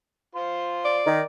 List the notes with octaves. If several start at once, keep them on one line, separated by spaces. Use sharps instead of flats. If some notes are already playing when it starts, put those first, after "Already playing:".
F4 C5 C6
D5
D#3